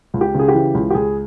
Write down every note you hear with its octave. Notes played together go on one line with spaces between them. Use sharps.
C#2
G4
C#3 G#4
G4
E3
C#2
G4
C#2 G#4